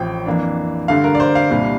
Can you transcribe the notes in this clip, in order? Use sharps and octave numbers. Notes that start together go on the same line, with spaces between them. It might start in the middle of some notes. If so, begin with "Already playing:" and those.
Already playing: A1 A2 F3 C4 G5
F2 E3 A#3 D4
G2 D3 A3 F5
A#4
D5
C5
F5
C2 A#2 G3 D4